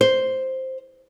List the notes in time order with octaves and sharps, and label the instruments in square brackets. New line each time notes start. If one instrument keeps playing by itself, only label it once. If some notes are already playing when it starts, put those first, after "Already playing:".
[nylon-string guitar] C5